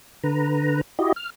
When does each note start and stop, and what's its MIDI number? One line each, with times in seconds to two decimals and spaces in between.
0.24 0.81 50
0.24 0.81 71
0.24 0.81 82
0.99 1.12 64
0.99 1.12 66
0.99 1.12 67
0.99 1.12 75
1.16 1.30 89